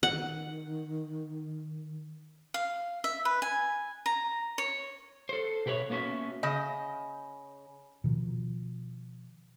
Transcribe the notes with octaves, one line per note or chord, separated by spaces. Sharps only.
D#3 F#5
F5
E5
B4
G#5
A#5
C#5
A4 C5
B2 G4 B4 C#5 E5
A#3 B3 C#4 F#4 E5
C#3 D#5
B2 D#3 F3